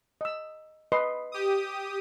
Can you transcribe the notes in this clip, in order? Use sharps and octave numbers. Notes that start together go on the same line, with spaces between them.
D#5 E6
B4 D#5 C6
G4 D#6